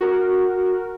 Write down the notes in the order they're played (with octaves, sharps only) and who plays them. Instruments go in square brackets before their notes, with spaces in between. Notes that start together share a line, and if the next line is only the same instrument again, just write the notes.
[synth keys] F#4 A#4